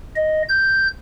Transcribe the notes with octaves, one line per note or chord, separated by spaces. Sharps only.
D#5
G6